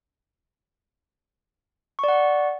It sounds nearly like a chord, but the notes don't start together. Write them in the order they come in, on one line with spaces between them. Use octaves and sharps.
C#6 D5 F#5